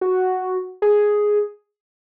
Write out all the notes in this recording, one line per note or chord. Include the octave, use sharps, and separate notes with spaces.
F#4
G#4